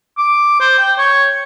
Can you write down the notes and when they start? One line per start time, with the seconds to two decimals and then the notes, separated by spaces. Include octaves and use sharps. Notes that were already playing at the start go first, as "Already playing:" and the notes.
0.18 D6
0.60 C5
0.78 G5
0.98 C#5